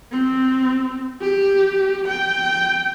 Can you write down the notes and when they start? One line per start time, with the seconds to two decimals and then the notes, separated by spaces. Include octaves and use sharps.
0.12 C4
1.21 G4
2.09 G5